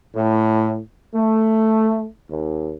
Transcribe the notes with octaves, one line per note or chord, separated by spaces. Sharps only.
A2
A3
D#2